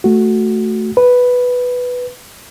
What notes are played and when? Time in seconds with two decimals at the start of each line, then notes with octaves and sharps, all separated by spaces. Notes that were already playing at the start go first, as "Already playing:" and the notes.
0.04 A3 F#4
0.97 B4